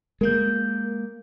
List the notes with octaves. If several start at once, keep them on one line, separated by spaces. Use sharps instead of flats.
G#3 A#3 A#4 G6